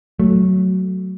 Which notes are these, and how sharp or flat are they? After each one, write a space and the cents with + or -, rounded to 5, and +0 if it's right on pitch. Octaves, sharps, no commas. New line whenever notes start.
F#3 +10 A3 +0